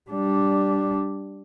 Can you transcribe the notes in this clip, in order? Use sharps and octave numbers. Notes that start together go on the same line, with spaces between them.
G3 D4